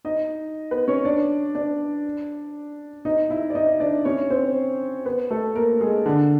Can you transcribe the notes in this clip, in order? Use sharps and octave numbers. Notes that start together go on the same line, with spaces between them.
D#4 D#5
B3 B4
C#4 C#5
D4 D5
D4 D5
D#4 D#5
E4 E5
D5
D#4 D#5
D4 D5
C#4 C#5
C4 C5
B3 B4
A3 A4
A#3 A#4
G#3 G#4
D3 D4